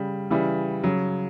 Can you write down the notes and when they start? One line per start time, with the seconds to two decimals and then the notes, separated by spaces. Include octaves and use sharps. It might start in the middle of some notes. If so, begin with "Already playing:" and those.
Already playing: C#3 G3
0.30 C#3 E3 G3
0.83 C#3 F#3